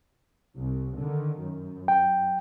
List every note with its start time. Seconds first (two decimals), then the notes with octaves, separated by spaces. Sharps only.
0.56 C2
0.98 D3 D#3
1.40 F#2
1.88 G5